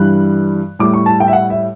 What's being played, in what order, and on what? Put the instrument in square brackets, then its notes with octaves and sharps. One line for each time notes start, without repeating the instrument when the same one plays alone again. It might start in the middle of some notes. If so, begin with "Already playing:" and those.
Already playing: [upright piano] G2 E3 G3 F#6
A2 G3 D6
C#6
A5
G5
E5
F#5
E5